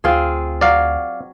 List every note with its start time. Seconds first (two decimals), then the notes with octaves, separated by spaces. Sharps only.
0.04 D2 C4 F4 G#4
0.61 F#3 D5 F5